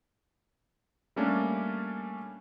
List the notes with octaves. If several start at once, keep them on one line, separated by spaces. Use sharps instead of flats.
G3 A3 A#3 C#4 D4